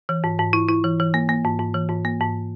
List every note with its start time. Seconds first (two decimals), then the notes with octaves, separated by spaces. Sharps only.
0.09 E3
0.24 G#2
0.39 G#2
0.53 E4
0.69 E4
0.84 E3
1.00 E3
1.14 A#3
1.29 A#3
1.45 G#2
1.59 G#2
1.74 E3
1.89 G#2
2.05 A#3
2.21 G#2